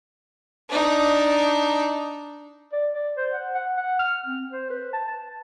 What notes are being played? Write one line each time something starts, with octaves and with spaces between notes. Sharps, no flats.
D4 D#4
D5
D5
C5
F#5
F#5
F#5
F6
C4
C5
B4
A5
A5